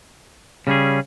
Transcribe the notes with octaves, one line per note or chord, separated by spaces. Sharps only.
C#3 G3 C#4 G#4